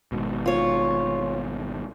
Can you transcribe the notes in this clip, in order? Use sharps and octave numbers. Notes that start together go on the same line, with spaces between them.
G#1 G#2 B2
F4 C#5